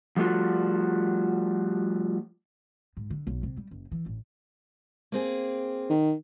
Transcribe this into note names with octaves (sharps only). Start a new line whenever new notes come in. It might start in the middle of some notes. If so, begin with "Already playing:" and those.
F3 G3 A3 F4 F#4
G#2
D3
B1
C3
G3
F#1
E3
A1
A#3 C4 G#4
D#3